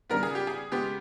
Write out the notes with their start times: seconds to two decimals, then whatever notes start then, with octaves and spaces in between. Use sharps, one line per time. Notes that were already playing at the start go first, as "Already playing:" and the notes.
0.10 C#3 G3 B3 A#4
0.23 G#4
0.35 G4
0.47 G#4
0.72 C#3 G#3 B3 G4